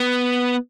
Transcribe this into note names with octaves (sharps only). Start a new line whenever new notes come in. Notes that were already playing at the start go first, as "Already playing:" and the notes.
Already playing: B3